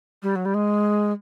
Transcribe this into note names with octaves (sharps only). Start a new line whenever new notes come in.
G3
F#3
G3
G#3